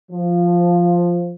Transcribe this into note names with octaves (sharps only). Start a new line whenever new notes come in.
F3